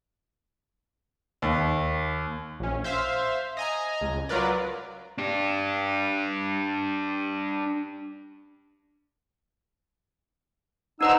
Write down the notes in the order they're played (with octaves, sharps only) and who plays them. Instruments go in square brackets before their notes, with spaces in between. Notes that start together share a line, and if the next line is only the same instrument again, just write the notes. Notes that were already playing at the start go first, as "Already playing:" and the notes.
[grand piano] D#2
[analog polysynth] A#1 C#4
C5 E5 F5
D#5 G#5 A#5
C#2
F#3 F4 A#4 B4 D5
[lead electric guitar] D4 G4
[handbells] D4 B4 A#5 [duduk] D#4 [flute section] C5 F#5 [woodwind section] E6